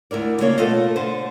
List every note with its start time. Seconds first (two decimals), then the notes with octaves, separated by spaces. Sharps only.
0.11 D2 E4 A#4 D5
0.41 C#3 A#3 D4 C#5
0.58 B2 A3 F4 A4 D#5
0.96 D3 C5